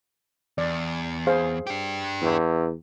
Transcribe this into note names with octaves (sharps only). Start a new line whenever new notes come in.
E2 D5
G#4 C5 F5
D4 G4
E2